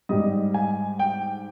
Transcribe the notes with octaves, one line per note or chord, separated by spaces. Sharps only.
G#2 G3 D#5
G#5
G5